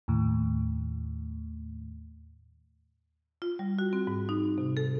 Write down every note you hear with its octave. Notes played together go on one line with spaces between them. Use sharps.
D#2 A2
F4
G3
F#4
C4
G#2
D#4
C3
A4